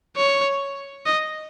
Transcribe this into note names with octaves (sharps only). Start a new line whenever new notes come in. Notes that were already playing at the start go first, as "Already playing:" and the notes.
C#5
D#5